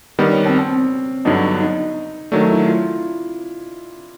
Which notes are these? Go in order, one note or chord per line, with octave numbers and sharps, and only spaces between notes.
D#3 G3 B3 D4
C#4
C4
C4
G2 D3 F#3 B3 D4 D#4
D#4
D#3 F#3 A3 D4
E4
F4